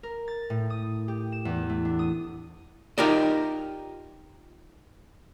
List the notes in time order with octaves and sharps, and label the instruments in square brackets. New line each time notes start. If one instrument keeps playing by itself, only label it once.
[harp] A#4
A6
A2
D#6
G4
E7
E2
A3
D4
D#6
[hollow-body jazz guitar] D#4 F4 G4 A#4 D5 D#5